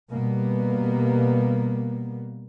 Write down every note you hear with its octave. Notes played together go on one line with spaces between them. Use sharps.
B2 G3 A#3 B3